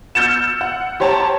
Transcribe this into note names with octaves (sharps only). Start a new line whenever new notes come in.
E6 F6 G6 A6 C#7 E7
F#5
G4 C5 C#5 A5 A#5